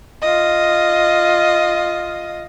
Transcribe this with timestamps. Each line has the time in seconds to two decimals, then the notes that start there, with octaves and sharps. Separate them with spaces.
0.22 F4 D#5